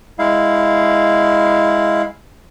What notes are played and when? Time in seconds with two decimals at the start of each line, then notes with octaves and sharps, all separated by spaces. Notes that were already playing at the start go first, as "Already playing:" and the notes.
0.19 G#3 E4 F5